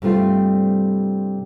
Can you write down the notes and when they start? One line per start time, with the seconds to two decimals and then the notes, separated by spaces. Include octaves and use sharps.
0.02 G2 C3 G3 A3 C4 F4